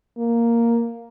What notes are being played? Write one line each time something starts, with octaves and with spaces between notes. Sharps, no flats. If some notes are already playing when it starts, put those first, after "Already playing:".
A#3